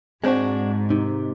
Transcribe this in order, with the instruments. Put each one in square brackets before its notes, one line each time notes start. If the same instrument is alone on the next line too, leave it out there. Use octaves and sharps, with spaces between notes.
[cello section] G#2 [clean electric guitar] G#3 D4 F#4 [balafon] C4 C5
[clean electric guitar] C3 [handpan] D#4